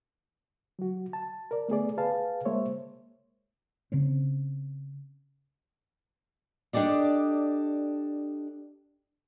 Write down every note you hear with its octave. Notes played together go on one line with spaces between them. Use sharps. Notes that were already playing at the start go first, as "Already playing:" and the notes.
F#3 F#4
A5
A#4 D5
A3 B3 G#4 D5
G#4 B4 F5 A5
G#3 A#3 C5 C#5 E5
C#3 C4 C#4
D4 G4 A4 D5 D#5